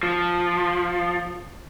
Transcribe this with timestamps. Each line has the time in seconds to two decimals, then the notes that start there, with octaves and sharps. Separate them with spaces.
0.03 F3